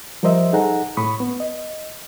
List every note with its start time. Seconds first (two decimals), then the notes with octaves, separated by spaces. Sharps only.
0.23 F3 G3 A#4 C5 D#5 E5
0.53 D#4 G#4 A4 F#5 A#5
0.97 A2 B5 C#6 D#6
1.20 B3
1.40 D#5